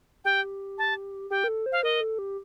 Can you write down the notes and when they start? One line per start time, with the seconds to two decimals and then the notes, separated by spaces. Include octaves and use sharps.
0.25 G4 G5
0.78 A5
1.31 G4 G5
1.44 A#4
1.48 A4
1.66 C5
1.72 F5
1.83 A#4 D#5
2.01 A4
2.19 G4